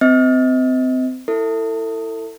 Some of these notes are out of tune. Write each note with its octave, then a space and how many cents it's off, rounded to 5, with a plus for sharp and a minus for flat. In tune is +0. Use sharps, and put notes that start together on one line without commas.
C4 -30 D#5 +35
E4 +0 A4 +30